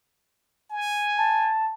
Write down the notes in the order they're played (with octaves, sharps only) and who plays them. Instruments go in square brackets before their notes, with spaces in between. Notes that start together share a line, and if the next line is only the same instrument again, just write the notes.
[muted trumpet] G#5
[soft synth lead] A5